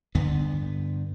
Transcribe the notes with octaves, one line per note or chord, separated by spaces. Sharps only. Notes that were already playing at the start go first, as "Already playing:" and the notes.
G2 D3 B3